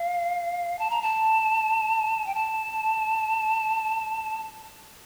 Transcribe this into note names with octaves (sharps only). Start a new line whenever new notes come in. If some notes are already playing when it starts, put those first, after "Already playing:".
Already playing: F5
A5
A#5
A5
G5
A5